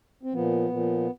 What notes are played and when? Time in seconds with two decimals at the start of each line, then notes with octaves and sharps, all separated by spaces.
0.23 C4
0.33 A#2 F3 B3
0.71 A#2 F3